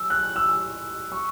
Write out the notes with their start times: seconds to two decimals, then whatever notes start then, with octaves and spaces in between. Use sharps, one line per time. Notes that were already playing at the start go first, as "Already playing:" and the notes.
Already playing: E6
0.10 F#6
0.36 E6
1.12 C#6